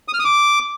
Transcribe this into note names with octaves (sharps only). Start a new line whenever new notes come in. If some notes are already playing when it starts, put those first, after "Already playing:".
D#6
F6
D#6
D6